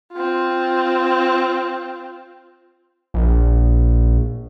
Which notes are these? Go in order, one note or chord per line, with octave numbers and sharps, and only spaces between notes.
C4 F4
A#1